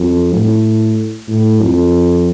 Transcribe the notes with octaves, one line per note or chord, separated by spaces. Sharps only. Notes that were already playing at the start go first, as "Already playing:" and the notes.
Already playing: F2
A2
A2
F2